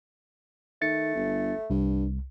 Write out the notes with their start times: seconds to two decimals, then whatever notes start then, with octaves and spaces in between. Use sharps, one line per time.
0.82 D#3 A3 A6 C#7
1.15 G1
1.70 C2 G2